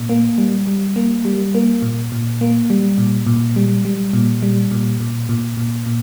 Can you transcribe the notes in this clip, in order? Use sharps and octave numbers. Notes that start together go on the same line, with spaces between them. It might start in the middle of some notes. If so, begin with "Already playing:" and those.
Already playing: A#2
A#3
G3
G3
A#3
G3
A#3
A#2
A#2
A#3
G3
A#2
A#2
G3
G3
A#2
G3
A#2
A#2
A#2
A#2
A#2